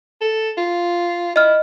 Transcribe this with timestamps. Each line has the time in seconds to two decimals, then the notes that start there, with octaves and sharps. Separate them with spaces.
0.21 A4
0.58 F4
1.36 E4 D#5 F6